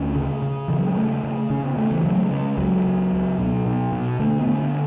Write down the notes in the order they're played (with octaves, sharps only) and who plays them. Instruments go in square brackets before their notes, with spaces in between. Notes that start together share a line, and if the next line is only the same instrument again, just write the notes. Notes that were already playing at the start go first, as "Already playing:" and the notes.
Already playing: [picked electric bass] D2 C#4
C#3
C#3
C#3 E3
F#3
G#3
C#3 A3
C#3
C#3 C#4
B3
C#3 A3
E3
C#3 F#3
G#3
C#3
C#2 F#3
C#2
C#2
B2
B2
B2
D3 A3
B3
D3
B3